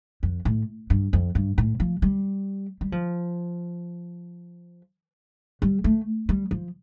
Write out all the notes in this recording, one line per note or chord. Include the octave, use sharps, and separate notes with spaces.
F2
A2
G2
F2
G2
A2
F3
G3
G3
F3
G3
A3
G3
F3